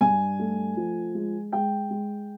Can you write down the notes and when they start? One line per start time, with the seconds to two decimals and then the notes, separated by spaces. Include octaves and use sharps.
0.01 G2 G#5
0.39 A3
0.77 F3
1.15 G#3
1.52 G#3 G5
1.91 G#3